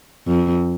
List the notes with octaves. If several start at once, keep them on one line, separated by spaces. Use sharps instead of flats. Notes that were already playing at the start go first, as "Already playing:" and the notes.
F2